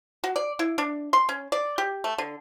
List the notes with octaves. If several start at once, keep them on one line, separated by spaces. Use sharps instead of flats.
F#4
D5
E4
D4
C6
C#4
D5
G4
A3
D3